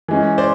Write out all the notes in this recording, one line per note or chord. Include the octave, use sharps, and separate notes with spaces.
E3 G#3 C#4
C5 D5